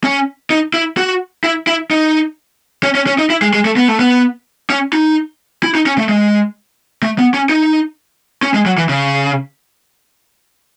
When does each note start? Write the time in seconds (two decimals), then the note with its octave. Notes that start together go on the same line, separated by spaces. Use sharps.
0.04 C#4
0.50 D#4
0.74 E4
0.97 F#4
1.44 E4
1.67 E4
1.91 D#4
2.83 C#4
2.95 C#4
3.07 C#4
3.19 D#4
3.30 E4
3.42 G#3
3.53 G#3
3.65 A3
3.76 B3
3.88 A3
3.99 B3
4.70 C#4
4.93 D#4
5.63 E4
5.75 D#4
5.86 C#4
5.98 A3
6.09 G#3
7.03 A3
7.18 B3
7.34 C#4
7.49 D#4
8.43 C#4
8.54 G#3
8.66 F#3
8.78 E3
8.89 C#3